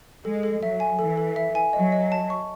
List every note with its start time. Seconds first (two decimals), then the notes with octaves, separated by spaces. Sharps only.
0.25 G#3 A4
0.43 A4
0.61 F#3 E5
0.80 G#5
0.99 E3 A4
1.17 A4
1.36 E5
1.55 G#5
1.73 F#3 D#5
1.92 D#5
2.12 A5
2.30 C#6